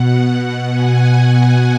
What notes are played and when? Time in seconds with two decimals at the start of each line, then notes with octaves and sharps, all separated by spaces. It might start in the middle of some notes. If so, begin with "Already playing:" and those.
Already playing: B2 F#5
0.38 F#5
0.68 G#5